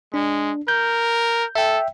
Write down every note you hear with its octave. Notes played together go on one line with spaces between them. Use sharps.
G#3 D4
A#4 G6
A4 E5 G5